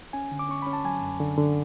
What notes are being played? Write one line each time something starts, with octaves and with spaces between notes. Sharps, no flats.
C#4 G#5
D3
D6
C#4 C#6
C#4 B5
A5
F#3 G#5
F#2
D3
D3